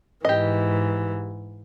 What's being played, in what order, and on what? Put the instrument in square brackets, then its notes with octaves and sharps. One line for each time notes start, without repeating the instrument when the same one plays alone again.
[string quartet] G#2 E3 [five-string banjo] G4 D#5